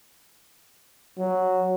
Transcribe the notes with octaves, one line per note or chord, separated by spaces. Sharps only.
F#3